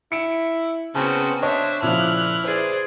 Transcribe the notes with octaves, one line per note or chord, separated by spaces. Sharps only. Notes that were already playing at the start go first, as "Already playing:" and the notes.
E4 C#7 D7 E7
C#3 B3 C4 F#4 A5
D4 C5 C#5 D#5 E5
A#2 C#3 F3 E4 F6 F#6
G#4 B4 C5 D5